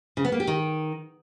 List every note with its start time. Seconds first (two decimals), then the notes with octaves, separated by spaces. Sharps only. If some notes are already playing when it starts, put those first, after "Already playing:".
0.17 C#3
0.25 B3
0.32 A#3
0.40 G4
0.47 D#3